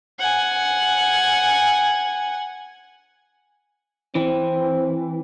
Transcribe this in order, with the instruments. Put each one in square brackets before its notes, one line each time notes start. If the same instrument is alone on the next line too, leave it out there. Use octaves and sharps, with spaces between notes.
[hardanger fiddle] F#5 G#5
[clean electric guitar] E3 [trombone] C4